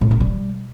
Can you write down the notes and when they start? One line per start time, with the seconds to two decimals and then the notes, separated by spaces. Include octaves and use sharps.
0.01 A2
0.11 C3
0.20 G3